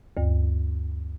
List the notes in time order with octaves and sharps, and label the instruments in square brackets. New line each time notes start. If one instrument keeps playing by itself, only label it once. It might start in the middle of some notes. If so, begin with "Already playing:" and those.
[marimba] D2 G2